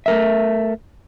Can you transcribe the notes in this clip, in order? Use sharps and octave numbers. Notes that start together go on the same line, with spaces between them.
A3 A#4 E5